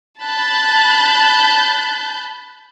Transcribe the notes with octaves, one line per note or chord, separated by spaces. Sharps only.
A5 B5 F#6 G6 A6